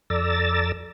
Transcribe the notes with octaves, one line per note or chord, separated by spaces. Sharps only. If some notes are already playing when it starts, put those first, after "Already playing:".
F2 A4 D5 A#5 E6 A6